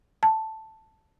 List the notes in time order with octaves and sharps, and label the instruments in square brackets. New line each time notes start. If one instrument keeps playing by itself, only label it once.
[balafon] A5